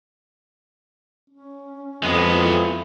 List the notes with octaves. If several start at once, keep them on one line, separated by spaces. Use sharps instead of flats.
C#4
F2 G#3 B3
E4